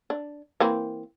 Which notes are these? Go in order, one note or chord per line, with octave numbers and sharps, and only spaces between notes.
D4
E3 A#3 C4